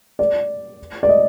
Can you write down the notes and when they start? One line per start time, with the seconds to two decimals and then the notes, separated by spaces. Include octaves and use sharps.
0.19 D5
1.03 D5
1.09 D#5